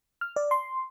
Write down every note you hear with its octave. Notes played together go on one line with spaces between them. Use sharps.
F6
D5
C6